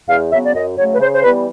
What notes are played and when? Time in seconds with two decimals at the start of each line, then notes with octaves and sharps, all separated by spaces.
0.08 E2 F5
0.31 C#3 F#3 B3 E5
0.44 D5
0.54 F#2 D#5
0.77 C#3 F#3 A3 C#5
0.94 B4
0.99 C#3 C5
1.15 C5
1.23 E3 G3 B3 B4